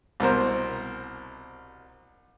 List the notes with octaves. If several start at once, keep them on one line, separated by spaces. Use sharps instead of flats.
C2 B2 A#4 C5